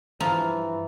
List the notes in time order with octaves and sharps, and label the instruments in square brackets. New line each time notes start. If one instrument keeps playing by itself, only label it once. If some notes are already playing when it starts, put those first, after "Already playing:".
[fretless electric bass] G2 [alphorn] E3 [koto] F3 [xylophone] A#5